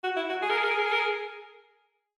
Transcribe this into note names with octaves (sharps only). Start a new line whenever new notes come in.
F#4
E4
F#4
G#4
A#4
G#4
A#4
G#4
A#4
G#4
A#4
G#4